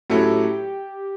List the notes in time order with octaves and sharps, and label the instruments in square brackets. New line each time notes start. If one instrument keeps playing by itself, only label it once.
[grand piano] A2 F#3 C#4 E4 A4 [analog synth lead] G4